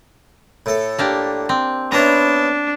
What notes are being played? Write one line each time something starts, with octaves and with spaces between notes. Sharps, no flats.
A2 A4
A#3 D4 G4
C4
B3 C#4 D4 E4 A#5